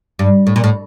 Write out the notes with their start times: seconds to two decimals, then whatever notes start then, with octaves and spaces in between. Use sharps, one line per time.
0.19 G2
0.47 A2
0.56 A#2
0.64 A2